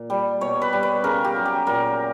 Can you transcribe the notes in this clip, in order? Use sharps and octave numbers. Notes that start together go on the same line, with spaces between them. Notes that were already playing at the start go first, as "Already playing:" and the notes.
Already playing: A#2
G3
B2 C#5
B4
G3
B4
C#3 A#4
G4
F#3
G4
A#2 A#4